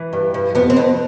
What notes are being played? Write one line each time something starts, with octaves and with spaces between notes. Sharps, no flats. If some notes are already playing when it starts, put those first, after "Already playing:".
Already playing: E3
G2
G2
F2 B3
C4
F2 B3